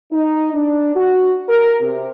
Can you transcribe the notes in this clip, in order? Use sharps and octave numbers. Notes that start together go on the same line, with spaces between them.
D#4
D4
F#4
A#4
C3